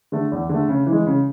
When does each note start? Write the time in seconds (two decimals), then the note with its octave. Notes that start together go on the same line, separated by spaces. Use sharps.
0.12 D3 A3
0.31 E2
0.49 D3 A3
0.69 C#3
0.86 E3
0.92 G#3
1.06 C#3